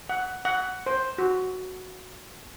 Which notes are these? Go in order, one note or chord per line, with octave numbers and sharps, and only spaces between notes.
F#5
F#5
C5
F#4